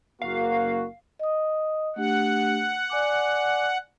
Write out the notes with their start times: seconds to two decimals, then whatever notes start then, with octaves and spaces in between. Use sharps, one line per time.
0.22 F#1 A#3 F#4 F5
1.19 D#5 D#6
1.96 A3 D4 G4 F#5
2.90 D5 G#5 D6